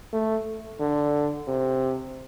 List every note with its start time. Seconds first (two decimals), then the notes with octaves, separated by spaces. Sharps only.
0.13 A3
0.81 D3
1.48 C3